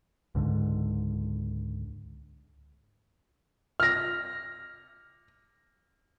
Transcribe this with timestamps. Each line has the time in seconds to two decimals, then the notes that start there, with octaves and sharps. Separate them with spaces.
0.35 C#2 G#2 D3
3.80 F6 A#6